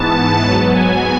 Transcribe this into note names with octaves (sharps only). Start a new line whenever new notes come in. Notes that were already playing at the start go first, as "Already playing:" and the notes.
Already playing: G#2 E3 B3 A5
G#2 F#3 B3 A5
G#5